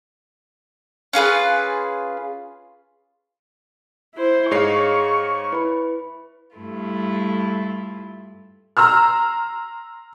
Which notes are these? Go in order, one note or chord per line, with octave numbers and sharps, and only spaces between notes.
C#4 F4 G#4 B4
E4 C5
G#2 G#4 C#5 D#5 F5 C#6 C7
E4 B4 B5
G2 A3 E4 F4
A#5 C6 E6 F6